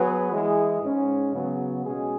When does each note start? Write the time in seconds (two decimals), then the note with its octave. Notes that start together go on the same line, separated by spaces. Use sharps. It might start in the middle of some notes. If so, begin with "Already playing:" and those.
Already playing: F#3 B3 G#4 B4
0.32 E3 G#3 E4 G#4
0.82 G#2 G#3 C#4
1.34 C#3 F#3 B3
1.86 B2 G#3 C#4 G#4